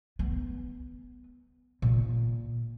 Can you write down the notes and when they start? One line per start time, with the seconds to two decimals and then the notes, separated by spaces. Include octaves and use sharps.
0.19 B3
1.82 A#2